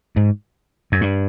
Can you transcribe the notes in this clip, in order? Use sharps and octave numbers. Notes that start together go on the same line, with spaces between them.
G#2
F#2
G2